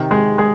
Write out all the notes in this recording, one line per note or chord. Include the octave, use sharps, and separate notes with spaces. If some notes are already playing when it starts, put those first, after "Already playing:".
Already playing: C3 D#3
G#3 G#4
G#3 G#4